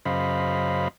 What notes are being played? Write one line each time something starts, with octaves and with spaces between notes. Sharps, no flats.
F#2 C#3 C5 D#5 F5 B5